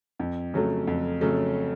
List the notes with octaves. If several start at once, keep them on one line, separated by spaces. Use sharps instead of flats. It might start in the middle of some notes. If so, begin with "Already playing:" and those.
F2
C#3 F#3 A3
F2
C#3 F#3 A3